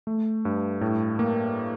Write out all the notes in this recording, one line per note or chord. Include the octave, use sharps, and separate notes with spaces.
A3
G2
A2
A#3